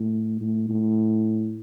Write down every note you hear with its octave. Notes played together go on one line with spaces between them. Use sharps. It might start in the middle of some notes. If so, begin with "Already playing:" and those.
Already playing: A2
A2
A2